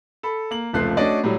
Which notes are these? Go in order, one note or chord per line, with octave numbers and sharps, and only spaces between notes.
A4 B5
A#3 F#7
F1 C#2 F3 A3 F#6 C7
A3 C#4 D4 F#4 D5 D#5
A2 F#3 G3